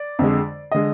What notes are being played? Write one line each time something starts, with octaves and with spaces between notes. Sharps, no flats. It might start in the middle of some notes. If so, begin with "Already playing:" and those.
Already playing: D5
F2 D3 G#3
D3 G#3 D#5